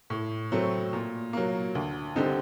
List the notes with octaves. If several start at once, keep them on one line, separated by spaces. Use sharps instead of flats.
A2
F#3 A3 C4
A#2
F#3 A#3
D2
D3 G3 C4 D#4